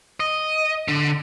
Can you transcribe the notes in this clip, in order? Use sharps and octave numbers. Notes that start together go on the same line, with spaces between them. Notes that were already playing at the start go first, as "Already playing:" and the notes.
D#5
D3